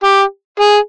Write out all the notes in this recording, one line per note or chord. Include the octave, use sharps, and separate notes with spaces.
G4
G#4